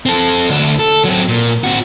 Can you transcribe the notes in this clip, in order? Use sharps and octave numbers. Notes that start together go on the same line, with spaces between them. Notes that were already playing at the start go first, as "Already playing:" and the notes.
C4 A4
D2 D4
A4
F#3 C4
A#2
C4 F#4